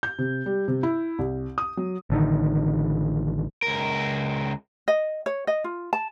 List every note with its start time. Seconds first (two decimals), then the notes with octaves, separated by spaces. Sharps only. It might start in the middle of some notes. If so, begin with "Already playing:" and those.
0.03 G6
0.18 C3
0.46 G3
0.68 C3
0.83 E4
1.19 C2
1.58 D#6
1.77 F#3
2.10 A1 D3 D#3
3.62 C#2 A#4
4.88 D#5
5.26 C#5
5.47 D#5
5.64 F4
5.93 A5